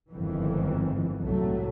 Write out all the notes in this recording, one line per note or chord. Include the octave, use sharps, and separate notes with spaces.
G1 F2 G#2 D#3 E3
C2 A2 F#3 A3